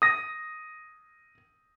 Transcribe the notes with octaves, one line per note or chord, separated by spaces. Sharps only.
D#6 A#6